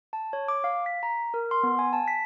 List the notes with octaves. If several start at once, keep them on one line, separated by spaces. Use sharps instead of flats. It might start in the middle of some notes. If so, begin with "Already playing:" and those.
A5
C#5
D6
F5
B6
A#5
A#4
C6
B3
G#5
A5
B6